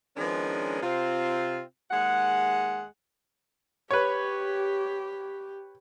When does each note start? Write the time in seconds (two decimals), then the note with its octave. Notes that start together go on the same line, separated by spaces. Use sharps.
0.17 D#3 F3 G#3 B3 C#4 D4
0.83 C3 C4 F4
1.91 D#2 G#3 G#4 F#5
3.91 G4 B4 C#5